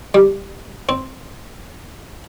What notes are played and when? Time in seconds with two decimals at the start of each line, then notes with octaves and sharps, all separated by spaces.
0.14 G3
0.89 C4